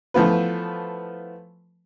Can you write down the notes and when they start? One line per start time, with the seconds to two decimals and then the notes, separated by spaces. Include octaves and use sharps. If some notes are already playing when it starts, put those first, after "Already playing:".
0.14 E3 F3 A3 B3 F4 B4